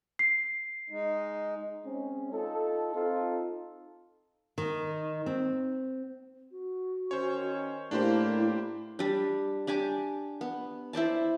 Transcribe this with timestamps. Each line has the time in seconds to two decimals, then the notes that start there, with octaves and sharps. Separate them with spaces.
0.19 C7
0.90 G#3 D#4
1.85 G#3 C4 C#4
2.32 D#4 F4 A4
2.94 C4 D#4 F4 A4
4.58 D#3
5.26 C4
6.51 F#4
7.11 D#3 C#4 C5 C#5
7.91 A2 A#3 D4 E4 G4 C5
8.99 G3 D4
9.67 D4 G4 G#5 D6
10.41 B3
10.93 E4 C5 D5 A5